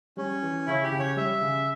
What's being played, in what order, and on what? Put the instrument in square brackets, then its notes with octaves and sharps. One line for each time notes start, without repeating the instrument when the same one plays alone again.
[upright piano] G3 [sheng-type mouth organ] C#4
[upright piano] E3
[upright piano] C#3 [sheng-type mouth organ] E4
[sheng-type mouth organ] G4
[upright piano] C#3
[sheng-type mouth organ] C#5
[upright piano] G3 [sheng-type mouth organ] E5
[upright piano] C#3